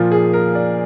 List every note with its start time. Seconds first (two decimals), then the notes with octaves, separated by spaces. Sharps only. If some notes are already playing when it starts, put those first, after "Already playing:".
Already playing: A#2 F3 F4
0.12 G#4
0.33 A#4
0.55 D5